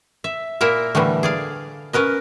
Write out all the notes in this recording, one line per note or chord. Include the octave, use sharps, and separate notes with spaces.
E5
A#2 A#3 E4 A#4 E5
A2 D3 E3 G3 A3
G#4 D5 F5
C#4 A#4 B4 D#5